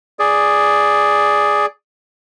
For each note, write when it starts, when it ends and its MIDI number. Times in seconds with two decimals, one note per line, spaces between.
0.19 1.66 68
0.19 1.66 74